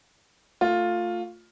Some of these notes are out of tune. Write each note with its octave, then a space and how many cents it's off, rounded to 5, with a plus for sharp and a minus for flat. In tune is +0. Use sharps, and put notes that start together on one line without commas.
A3 +30 F4 +10